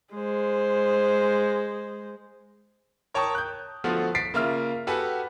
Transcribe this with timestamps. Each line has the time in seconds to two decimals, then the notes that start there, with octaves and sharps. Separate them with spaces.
0.14 G#3 C5
3.14 A#4 C#5 G5 A5 C#6 D#6
3.35 F#6 G6
3.84 D3 F3 A3 B3 F4 F#4
4.15 A6 B6 C7 D7
4.34 C#3 A#3 F4 E5 F6
4.87 F#4 G4 A4 B4 F#5 G#5